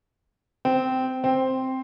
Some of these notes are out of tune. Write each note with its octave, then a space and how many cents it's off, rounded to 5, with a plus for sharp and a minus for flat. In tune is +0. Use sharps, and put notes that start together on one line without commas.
C4 -15
C4 +0